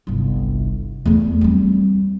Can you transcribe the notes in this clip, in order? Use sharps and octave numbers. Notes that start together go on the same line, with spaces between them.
G1 C2
E2 A3
G3 C4